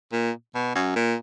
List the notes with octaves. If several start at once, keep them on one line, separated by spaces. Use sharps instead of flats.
A#2
B2
F#2
A#2